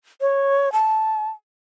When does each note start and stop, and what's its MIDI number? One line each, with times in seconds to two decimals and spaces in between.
0.21 0.72 73
0.72 1.30 81